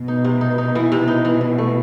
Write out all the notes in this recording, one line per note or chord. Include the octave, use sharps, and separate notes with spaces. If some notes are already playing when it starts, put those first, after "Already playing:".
Already playing: B2
D#4
C3
D#4
D#4
E3
C3
D#4
E3
E3
A3